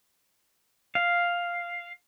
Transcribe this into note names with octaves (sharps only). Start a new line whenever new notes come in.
F5